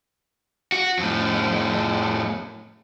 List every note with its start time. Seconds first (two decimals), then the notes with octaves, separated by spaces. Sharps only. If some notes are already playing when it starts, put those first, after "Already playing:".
0.72 F#4
0.99 F2 A2